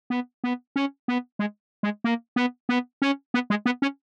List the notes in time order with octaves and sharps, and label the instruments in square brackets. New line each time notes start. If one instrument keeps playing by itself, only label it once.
[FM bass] B3
B3
C#4
B3
G#3
G#3
A#3
B3
B3
C#4
B3
G#3
B3
C#4